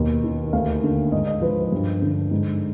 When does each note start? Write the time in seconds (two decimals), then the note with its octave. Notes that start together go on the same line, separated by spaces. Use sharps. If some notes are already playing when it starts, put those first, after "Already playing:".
Already playing: D#2 B2
0.24 D#3
0.53 D2 F5
0.83 D3
1.12 G#2 D#5
1.27 D#5
1.42 F3 B4
1.72 G2
2.02 D3
2.31 G#2